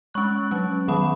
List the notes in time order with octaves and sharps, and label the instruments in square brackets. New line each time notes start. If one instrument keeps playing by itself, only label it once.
[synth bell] G#3 C#4 C#6 F#6
F#3 C#4
D#3 F#3 B3 B5 D#6